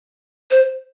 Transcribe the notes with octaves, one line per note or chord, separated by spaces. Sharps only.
C5